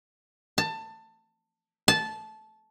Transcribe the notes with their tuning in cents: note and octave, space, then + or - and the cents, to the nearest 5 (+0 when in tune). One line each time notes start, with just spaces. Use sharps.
A5 +20
A5 -15